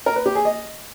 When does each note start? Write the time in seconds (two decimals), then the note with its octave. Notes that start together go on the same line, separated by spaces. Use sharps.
0.06 A#4
0.16 B4
0.26 G4
0.35 G#4
0.45 D#5